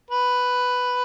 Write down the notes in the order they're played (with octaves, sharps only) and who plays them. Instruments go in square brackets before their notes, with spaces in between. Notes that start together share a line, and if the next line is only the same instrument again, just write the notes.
[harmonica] B4